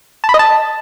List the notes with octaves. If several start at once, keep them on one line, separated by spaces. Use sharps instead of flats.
A5
B5
D#5
A5